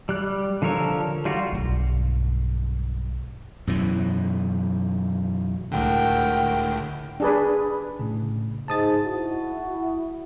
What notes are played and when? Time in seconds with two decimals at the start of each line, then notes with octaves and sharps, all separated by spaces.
0.09 G3 F#6
0.62 D3 F3 A4 A#4 C#5
1.25 G3 F4 F#4
1.52 B1 G2
3.67 F#2 B2 E3
5.72 C#2 A2 D3 F#4 A#4 G5
7.20 D4 G#4 B4
7.99 A2 C#3
8.68 G#2 A5 D#6 A6
9.05 E4 F#4